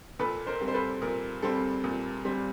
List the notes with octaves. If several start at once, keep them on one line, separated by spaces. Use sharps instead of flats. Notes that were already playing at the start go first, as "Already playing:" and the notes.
A#2 A4 B4
A#4 C5
G3 C4
C5
A4 B4
A#2 A#4
G3 C4 A4
A#2
G3 C4